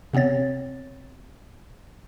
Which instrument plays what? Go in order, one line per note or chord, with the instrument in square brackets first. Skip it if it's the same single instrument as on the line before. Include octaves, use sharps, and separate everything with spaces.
[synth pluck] C3 B3 C4 C#5 A6